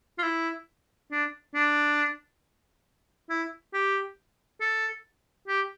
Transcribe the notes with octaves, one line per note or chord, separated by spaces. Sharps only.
F4
E4
D4
D4
E4
G4
A4
G4